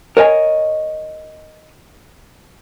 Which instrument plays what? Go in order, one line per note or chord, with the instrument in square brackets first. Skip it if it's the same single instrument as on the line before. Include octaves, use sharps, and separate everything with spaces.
[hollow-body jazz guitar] A#4 C#5 D#5 G#5